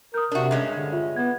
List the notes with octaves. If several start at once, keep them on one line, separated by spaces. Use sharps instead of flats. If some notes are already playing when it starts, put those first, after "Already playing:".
A#4 D#6 G6
C3 D4 F#4 A#4 E5
G2 G#3 C#4
D3
F4 E5
B3 G#6